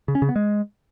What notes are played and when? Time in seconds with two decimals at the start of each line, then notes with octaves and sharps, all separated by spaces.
0.08 C#3
0.15 C#4
0.22 C#3
0.29 B3
0.36 G#3